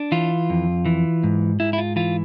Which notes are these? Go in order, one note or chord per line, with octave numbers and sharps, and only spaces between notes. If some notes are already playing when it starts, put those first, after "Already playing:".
Already playing: D4
E3 F4
F2
E3
G#2
G#2 E4
E4
F4
E3 F4